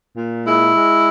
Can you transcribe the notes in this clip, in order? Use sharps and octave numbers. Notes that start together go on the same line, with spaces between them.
A#2
G#3 E4
G#3